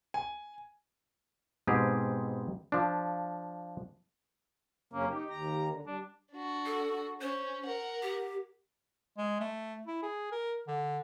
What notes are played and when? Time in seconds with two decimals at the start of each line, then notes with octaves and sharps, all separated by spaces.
0.14 G#5
1.67 G#2 B2 C4 G4 G#4
2.72 F3 D4
4.93 F#2 C#3 A#3 C#4
5.10 D#4 G4
5.30 D#2 A#5
5.69 D3
5.87 G3 D4
6.32 D4 F#4
6.66 A4
7.21 C#4 C5
7.66 A#4 F#5
8.03 G4
9.17 G#3
9.40 A3
9.87 E4
10.02 G#4
10.32 A#4
10.67 D3